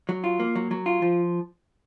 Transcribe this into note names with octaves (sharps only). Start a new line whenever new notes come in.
F#3
F4
A#3
F#3
F#3
F4
F3